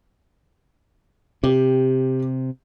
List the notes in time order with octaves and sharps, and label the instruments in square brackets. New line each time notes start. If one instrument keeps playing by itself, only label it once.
[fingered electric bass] C3 [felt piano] G4